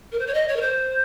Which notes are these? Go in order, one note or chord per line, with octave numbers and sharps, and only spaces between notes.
A#4
C5
C#5
D#5
C#5
A#4
C5